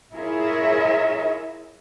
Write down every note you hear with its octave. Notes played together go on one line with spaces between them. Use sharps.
E4 F4 G#4 A#4 C#5 E5